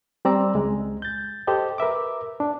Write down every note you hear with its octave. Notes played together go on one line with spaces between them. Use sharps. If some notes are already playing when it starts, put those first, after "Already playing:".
G3 C4 D5 A#5 E6
C#2 G#3
G6 A6
G4 A4 C5 D#5
A#4 B4 E5 D6
D4